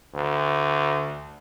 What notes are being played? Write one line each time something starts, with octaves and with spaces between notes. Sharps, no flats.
D2